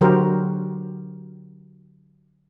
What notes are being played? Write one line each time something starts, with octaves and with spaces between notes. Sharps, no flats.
D3 F#3 F#4 G4 A#4 C5